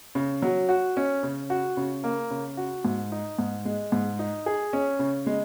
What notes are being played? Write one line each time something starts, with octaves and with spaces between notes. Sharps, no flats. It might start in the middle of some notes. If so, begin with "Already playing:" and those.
C#3
F#3
F#4
C#4
C#3
F#4
C#3
A#3
C#3
F#4
G#2
D#4
G#2
G#3
G#2
D#4
G#4
C#4
C#3
G#3